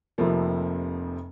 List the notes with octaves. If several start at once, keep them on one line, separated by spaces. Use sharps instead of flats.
F1 F2 C3 F3 A#3